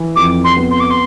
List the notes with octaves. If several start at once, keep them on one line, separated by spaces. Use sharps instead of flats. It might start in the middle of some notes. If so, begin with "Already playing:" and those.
Already playing: E3
F2 D6
C6
B3
C6
D6
C6